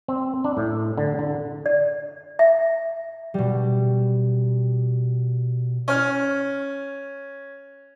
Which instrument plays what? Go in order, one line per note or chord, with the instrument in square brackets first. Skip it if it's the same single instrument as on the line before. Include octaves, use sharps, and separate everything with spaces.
[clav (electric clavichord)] C4
D4
A2
D3
D3
[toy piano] D5
E5
[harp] B2 G3
[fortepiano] C#4 F6